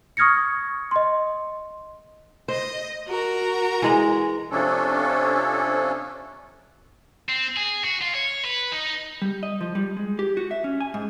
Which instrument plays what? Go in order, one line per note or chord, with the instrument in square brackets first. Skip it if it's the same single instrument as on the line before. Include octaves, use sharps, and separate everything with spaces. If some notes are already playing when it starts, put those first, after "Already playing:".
[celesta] C#6 D#6 F6 G#6 A#6 C#7
D#5 C6
[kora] C5 [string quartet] D#5
[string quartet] F#4 A#4 A#5
[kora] E3 G#3 D#5
[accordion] C3 F3 C#4 D4 A4
[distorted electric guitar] C4
G#4
F#4
F4
C#5
B4
D#4
[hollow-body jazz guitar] G3
D#5
F3
G3
G#3
G4
F#4
E5
C#4
G#5
G#2